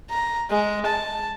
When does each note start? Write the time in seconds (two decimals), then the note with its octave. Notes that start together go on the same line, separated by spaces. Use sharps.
0.10 A#5
0.50 G#3
0.86 A5